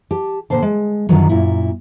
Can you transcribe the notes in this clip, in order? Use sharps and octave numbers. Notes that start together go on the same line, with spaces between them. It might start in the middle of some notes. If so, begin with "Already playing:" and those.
G4 A5
A#2 D3 C5 A5
G#3
F#2 D3 D#3 F3 F#3
F#2 A#2 E4